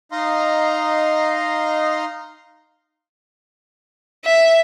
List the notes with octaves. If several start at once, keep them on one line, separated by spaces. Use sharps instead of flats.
D#4 D#5 F5 A#5 C6
E5